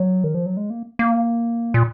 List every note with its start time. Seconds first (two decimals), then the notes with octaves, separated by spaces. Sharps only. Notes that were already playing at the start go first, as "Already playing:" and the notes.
Already playing: F#3
0.24 D#3
0.35 F3
0.46 F#3
0.57 G#3
0.70 A#3
0.99 A#3
1.74 A#2